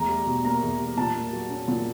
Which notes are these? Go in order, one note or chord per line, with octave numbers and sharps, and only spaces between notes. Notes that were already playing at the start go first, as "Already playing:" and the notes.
Already playing: E2 A3 A#5
G3
B2
A#3 A#5
E2
G3
A#2 A5
A#3
F#3
C#4
A#2